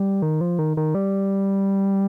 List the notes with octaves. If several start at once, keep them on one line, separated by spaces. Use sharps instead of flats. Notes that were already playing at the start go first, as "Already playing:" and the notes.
Already playing: G3
D#3
F3
D#3
D#3
G3